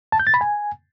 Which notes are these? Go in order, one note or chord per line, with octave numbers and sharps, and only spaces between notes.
A5
G6
A6
B5
G#5